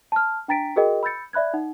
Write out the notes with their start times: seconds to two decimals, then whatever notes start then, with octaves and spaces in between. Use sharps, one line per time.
0.12 A5 F6
0.48 D4 G5 A#5 A6 B6 D7
0.76 F#4 G#4 A#4 D#5 G5
1.03 B5 E6 G6 A6 C#7
1.33 D5 E5 B5 F#6 G#6
1.54 D#4 F#5